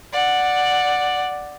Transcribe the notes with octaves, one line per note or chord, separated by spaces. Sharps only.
D5 F#5